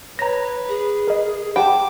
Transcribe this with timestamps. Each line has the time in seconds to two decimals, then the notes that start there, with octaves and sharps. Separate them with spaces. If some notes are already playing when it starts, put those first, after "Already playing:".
0.19 B4 C#5 A#5 A#6
0.69 G#4
1.08 A#4 D#5
1.56 G4 F#5 G5 A5 B5 D6